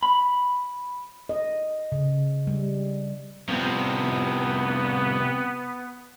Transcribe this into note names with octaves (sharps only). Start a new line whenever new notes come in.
B5
D#5
C#3
G3
C2 C3 F3 B3